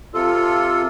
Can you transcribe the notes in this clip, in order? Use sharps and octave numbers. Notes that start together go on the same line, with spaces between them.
C3 F4 A4